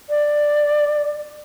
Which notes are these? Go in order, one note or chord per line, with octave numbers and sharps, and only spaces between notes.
D5